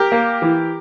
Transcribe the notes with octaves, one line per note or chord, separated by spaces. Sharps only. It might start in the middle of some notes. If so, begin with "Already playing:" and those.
Already playing: G4 A#4
A#3
E3